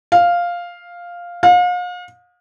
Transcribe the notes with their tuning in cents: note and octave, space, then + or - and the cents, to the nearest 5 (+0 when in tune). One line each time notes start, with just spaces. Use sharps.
F5 +0
F5 +40